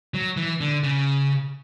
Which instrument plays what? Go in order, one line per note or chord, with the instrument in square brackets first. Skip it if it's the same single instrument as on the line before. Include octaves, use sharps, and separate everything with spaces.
[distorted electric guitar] F#3
E3
D3
C#3